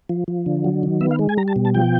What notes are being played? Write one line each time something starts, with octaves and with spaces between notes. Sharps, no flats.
F3
F3
D3
F#3
D#3
B3 E5
F5
G#3
G#5
G3 A#5
A5
B2
A5
F3 G5